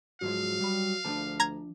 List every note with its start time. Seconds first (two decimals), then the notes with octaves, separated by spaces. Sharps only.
0.22 G#2 F3 F#3 G#3 F5
0.60 G3 B5
1.05 D2 F3 D4 A5
1.40 A#5 G#6